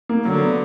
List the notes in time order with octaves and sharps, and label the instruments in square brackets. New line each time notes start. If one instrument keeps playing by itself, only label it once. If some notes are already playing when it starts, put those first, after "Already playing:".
[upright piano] A#3
[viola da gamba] D3 [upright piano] F#3
[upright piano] B3